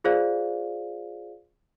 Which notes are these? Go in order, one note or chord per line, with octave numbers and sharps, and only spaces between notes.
F4 G#4 C5 D5 F5